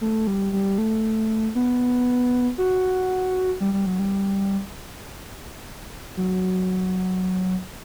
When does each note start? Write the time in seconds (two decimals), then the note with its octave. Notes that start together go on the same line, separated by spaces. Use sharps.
0.01 A3
0.27 G3
0.53 G3
0.78 A3
1.55 B3
2.58 F#4
3.60 G3
3.73 G3
3.86 F#3
3.99 G3
6.17 F#3